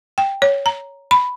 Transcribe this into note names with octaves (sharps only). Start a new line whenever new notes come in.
G5
C#5
A#5
B5